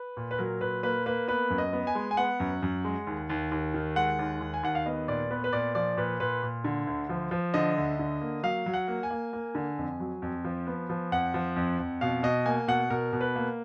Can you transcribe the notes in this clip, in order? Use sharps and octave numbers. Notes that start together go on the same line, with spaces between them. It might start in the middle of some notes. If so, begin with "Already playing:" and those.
Already playing: B4
A#2
B4
F#3 A#4
A#2 B4
A#3 B4
A#3 B4
B3 B4
F#2
D#5
B3
G#5
G#3
G#5
B3 F#5
F#2
F#2
G#3
D#2
D#2
D#2
D#3
G#3 F#5
D#2
D#2
G#5
D#2 F#5
F5
B3 D#5
A#2 D5
B3 B4
B4
A#2 D5
F3 D5
A#2 B4
A#2 B4
A#2
D3
D2
F3
F3
D3 D#5
D2
D3
A#3
F#3 F5
F#3
F#5
A#3
G#5
A#3
A#3
D3
F2
F#3
F2
F3
B3
F3
F2 F#5
F3
F2
F2
B2 F5
B2 D#5
A#3 G#5
B2 F#5
B2 A#4
B2
B4
A#3